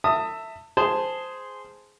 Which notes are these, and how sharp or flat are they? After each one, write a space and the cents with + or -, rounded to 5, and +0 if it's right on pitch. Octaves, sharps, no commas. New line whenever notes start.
E5 +0 A5 +30 D#6 +0
G#4 +0 C5 -10 A5 +0